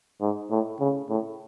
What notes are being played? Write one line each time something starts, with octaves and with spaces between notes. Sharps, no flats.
G#2
A2
C#3
A2